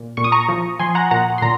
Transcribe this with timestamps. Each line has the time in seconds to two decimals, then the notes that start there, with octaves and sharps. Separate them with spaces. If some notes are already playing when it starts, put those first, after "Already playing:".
Already playing: A#2
0.17 A#2 C#6
0.24 D#6
0.32 A#5 C#6
0.49 F3
0.79 F3 G#5 C6
0.95 F#5 A#5
1.11 A#2 F#5 A#5
1.38 C6
1.42 A#2 A#5